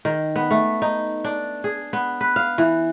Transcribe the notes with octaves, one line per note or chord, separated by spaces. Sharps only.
D#3
B3
A3
D#4
D4
G#4
B3
B4
F5
E3